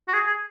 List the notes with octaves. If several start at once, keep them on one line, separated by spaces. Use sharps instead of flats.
F#4
G#4
G#4